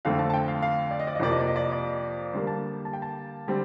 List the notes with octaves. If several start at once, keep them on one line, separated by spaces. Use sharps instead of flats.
F2 D3 A3 C4 F5
A5
A5
G5
F5
F5
D5
D#5
D5
D#5
F2 C3 F3 A#3 D5
D#5
D5
D#5
D5
D#5
D5
D3 G3 A#3 C5
A5
A5
G5
A5
D3 G3 C4